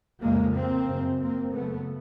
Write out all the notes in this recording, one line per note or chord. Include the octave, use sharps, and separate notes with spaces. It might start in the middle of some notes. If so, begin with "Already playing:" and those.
F2 C#3 G#3 A#3
A#3 C4
F#2 C#3
A#3 C4
F#2 C#3 A3 B3